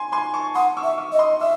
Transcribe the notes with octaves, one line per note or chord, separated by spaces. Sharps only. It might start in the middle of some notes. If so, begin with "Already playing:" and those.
Already playing: G#5 C6
G#5 C6
A5 C#6
F#5 C6 D#6
C#6 E6
E5
C#6 E6
D#5
C6 D#6
E5 E6